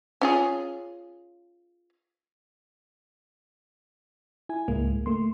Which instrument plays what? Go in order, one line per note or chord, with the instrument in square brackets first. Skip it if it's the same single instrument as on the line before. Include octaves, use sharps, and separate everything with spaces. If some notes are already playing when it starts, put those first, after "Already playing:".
[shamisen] C#4 F4 G#4
[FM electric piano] E4 G#5
C#2 G#2 G#3 A#3
A3 A#3 C6